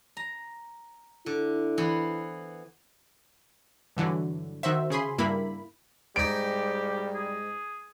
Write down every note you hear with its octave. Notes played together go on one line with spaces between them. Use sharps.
A#5
D3 E4
E3 B3 C5
G2 D3 E3 F#3
D#3 F#4 C5 E5
C#3 G#4 B5 C6
G2 A#3 E4 B5
G#2 G3 D#4 G4 D7
G#4